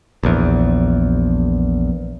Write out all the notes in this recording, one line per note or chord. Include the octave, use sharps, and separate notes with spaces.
A#1 E2